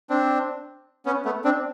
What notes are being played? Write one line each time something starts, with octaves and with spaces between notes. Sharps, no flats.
C4 D4
B3 C#4
A3 B3
C4 D4